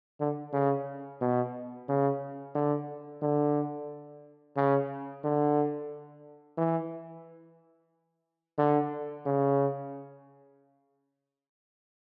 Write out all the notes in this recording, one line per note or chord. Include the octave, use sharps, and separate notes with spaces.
D3
C#3
B2
C#3
D3
D3
C#3
D3
E3
D3
C#3